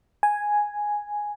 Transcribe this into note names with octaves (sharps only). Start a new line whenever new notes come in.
G#5